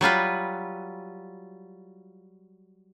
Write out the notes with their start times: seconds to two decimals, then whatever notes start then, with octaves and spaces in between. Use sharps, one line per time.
0.01 F#3 G3 F4 B4